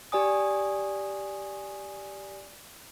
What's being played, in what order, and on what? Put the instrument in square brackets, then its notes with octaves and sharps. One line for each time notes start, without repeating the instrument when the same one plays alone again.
[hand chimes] G4 D5 G#5 D#6